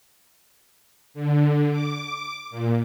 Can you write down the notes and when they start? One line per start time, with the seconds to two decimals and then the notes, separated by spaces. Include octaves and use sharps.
1.14 D3
1.70 D6
2.51 A#2